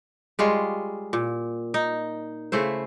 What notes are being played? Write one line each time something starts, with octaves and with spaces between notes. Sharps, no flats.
G3 G#3 F4 C#5
A#2
D#4
C#3 A3 E4 C5